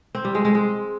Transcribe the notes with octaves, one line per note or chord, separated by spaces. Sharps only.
C4
G3
G#3
G#3
G#3